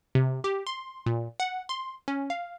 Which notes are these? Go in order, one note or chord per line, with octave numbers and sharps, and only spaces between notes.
C3
G4
C6
A#2
F#5
C6
C#4
F5